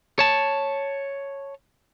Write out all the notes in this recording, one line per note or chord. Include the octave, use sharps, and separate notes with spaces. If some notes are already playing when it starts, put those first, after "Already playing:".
C#5 A5